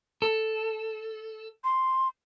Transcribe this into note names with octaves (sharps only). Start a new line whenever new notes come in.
A4
C6